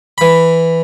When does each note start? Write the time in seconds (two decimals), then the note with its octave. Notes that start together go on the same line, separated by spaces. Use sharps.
0.18 E3 B5